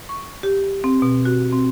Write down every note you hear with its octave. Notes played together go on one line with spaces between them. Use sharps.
C#6
G4
C4
B2
F#4
C4